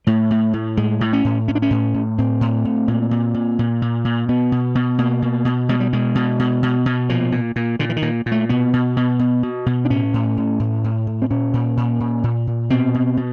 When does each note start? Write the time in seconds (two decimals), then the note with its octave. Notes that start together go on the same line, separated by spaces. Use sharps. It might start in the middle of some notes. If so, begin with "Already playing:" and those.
0.07 A2 A3
0.31 A2
0.53 A2
0.77 A2 G#3
1.01 A2
1.13 C#4
1.24 A2
1.48 A2 C#4
1.55 D4
1.62 C#4
1.70 A2
1.94 A2
2.18 A2 C4
2.41 A2
2.65 A2
2.88 A#2
3.11 A#2
3.34 A#2
3.59 A#2
3.82 A#2
4.05 A#2
4.29 B2 B3
4.52 B2
4.75 B2
4.98 B2 A#3
5.22 B2
5.45 B2
5.69 B2 G#3
5.80 G3
5.93 B2 G#3
6.15 B2
6.39 B2
6.63 B2
6.86 B2
7.09 A#2 F3
7.32 A#2
7.56 A#2
7.79 A#2 D3
7.89 E3
7.96 D#3
8.02 A#2
8.26 A#2
8.32 A3
8.49 B2 B3
8.73 B2
8.96 B2
9.19 B2
9.43 B2
9.66 B2
9.85 D4
9.90 A2 C#4
10.14 A2
10.37 A2
10.60 A2
10.84 A2
11.07 A2
11.22 C4
11.30 A#2 C#4
11.53 A#2
11.77 A#2
12.00 A#2
12.23 A#2
12.47 A#2
12.70 B2 C4
12.94 B2
13.17 B2